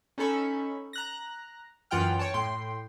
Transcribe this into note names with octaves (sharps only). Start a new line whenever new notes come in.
C#4 D#4 A4 B5 C#6
A#5 F#6 A#6
F#2 E3 F4 F#5 G5 F6
C#5 G5 A5
A2 G5 C6